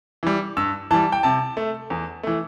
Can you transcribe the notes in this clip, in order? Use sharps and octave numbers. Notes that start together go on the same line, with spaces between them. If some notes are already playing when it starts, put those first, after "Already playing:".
E3 G3
G2 E6
E3 G3 A5
G5
C3 A5
A3
E2
E3 A3